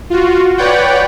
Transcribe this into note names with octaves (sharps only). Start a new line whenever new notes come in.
F4 F#4
B4 C#5 D5 F#5 G5